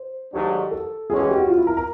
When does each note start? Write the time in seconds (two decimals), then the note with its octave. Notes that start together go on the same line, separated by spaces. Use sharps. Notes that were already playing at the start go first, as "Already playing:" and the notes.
Already playing: C5
0.33 G#2 D#3 F#3 A3 D4 G4
0.71 A4
1.09 A2 E3 G#3 C#4 F#4 G#4
1.20 G#4
1.29 G4
1.38 F#4
1.48 F4
1.58 E4
1.67 A#4
1.77 A#4